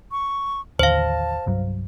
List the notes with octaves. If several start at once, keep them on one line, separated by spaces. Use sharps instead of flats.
C#6
A1 D#2 D3 C5 F5 A5
C2 G2 F#3